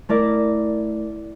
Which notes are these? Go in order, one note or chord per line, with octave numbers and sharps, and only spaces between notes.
A3 E4 A#4 D5